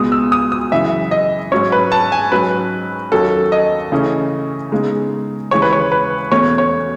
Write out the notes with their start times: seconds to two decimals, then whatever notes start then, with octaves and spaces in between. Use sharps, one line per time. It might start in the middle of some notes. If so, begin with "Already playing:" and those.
Already playing: C#2 B2 G#3 B3 D#6
0.12 E6
0.32 D#6
0.52 D#6
0.71 F#2 C#3 E3 E5
1.11 D#5
1.52 G#2 F#3 C#4 C#5
1.72 B4
1.92 A5
2.12 G#5
2.31 G#2 F#3 C#4 B4
3.12 D#2 D#3 F#3 C#4 A4
3.52 D#5
3.92 C#3 E3 A3 C#4
4.72 C#3 G#3 B3 D#4
5.51 D#2 C#3 E3 G#3 C#5
5.62 B4
5.73 C#5
5.92 B4
6.31 E2 B2 A3 C#4 C#5
6.58 C#5